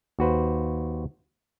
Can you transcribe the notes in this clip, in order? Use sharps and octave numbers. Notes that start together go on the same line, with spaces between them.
D#2 F#4 B4 C5